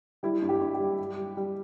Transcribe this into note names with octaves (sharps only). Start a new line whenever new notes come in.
G3 E4
G2
G4
G2
G4
G3
G3
G3
G3